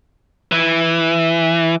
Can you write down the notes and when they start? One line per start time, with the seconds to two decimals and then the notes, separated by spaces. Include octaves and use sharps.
0.52 E3